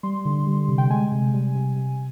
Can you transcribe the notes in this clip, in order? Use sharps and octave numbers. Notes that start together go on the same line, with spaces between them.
G3 C6
D3
G3
C3
G5
G#3 G#5
C3
G3
C3
C3